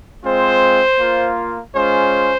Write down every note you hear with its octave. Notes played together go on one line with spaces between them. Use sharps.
G#3 C4 F4 C5
A#3 F4
G#3 C#4 F4 C5